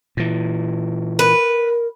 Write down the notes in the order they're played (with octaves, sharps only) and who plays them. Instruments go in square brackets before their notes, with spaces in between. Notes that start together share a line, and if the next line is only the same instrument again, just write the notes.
[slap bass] A#2 E3
[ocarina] A#4 [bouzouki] B4